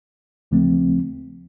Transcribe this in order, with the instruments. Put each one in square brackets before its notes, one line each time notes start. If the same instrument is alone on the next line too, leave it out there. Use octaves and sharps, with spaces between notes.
[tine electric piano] D#2 C#3 F3 A3 C4